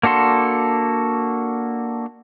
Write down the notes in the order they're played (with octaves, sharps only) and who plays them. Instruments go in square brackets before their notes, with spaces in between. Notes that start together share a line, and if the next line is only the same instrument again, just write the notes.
[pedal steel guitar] A#3 D4 F#4 A4 C6